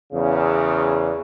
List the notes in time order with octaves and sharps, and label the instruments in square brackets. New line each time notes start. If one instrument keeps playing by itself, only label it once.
[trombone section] E2 C#3